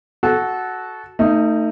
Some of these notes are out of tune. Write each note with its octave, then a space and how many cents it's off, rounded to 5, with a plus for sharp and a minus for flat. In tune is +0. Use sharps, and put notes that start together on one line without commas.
F#4 +0 A4 -20
A3 +30 D#4 +0